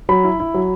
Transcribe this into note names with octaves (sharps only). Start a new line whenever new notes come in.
F#3 B5
E4
E4
F#3